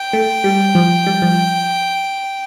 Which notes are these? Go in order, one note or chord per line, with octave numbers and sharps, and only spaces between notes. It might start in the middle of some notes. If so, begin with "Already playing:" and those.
Already playing: G5
A3
G3
F3
G3
F3